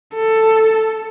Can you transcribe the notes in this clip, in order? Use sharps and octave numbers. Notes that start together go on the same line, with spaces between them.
A4